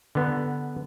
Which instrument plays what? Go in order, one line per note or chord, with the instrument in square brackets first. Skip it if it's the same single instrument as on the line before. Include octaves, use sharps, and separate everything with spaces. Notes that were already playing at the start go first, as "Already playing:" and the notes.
[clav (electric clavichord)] D3 B3